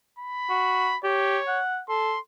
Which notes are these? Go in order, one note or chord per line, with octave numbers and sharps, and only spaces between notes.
B5
F#4
G4 C#5
F#5
A4 C6